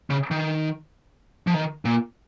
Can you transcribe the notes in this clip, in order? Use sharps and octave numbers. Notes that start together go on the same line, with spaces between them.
C#3
D#3
F3
D#3
A#2